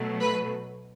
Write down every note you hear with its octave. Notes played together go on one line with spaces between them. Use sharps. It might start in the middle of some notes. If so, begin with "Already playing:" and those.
Already playing: B2 F#3 A3
B4